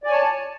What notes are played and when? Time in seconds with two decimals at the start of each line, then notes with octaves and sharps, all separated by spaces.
0.03 D5
0.07 G#5
0.10 C#5
0.13 A5